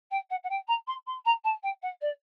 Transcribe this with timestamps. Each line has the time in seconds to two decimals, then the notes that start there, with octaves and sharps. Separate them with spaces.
0.11 G5
0.30 F#5
0.43 F#5
0.49 G5
0.67 A#5
0.87 C6
1.06 C6
1.25 A#5
1.44 A5
1.63 G5
1.82 F#5
2.01 D5